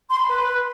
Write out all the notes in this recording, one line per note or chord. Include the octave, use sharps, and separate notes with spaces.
C6
B5
B4